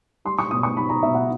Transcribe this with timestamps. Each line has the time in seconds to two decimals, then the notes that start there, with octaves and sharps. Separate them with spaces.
0.25 G3 C6
0.39 C#6
0.51 B2 D#6
0.63 C#6
0.77 G3 B5
0.89 A#5
1.03 B2 E5
1.15 F#5